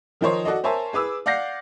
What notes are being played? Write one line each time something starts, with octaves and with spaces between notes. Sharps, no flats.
D#3 F3 D#4 A#4 C5 C#5
F#4 A4 D5 D#5
A#4 C5 C#5 E5 G#5 A5
G#4 B4 D6 E6
D5 F5 F#5 G6 A#6 C7